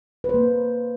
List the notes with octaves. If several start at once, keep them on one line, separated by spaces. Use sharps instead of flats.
B4
C5
A#3